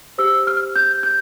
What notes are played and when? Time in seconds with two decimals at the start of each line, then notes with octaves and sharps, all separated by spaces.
0.18 G4 C5 E6
0.47 F6
0.76 G6
1.03 G6